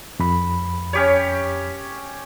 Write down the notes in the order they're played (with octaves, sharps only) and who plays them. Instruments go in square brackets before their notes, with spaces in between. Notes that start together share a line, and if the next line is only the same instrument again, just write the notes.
[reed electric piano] F2 B5
[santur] C#4 G4 C#5